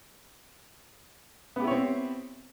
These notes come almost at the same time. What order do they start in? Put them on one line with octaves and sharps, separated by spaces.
B3 G4 E4 C#5 C4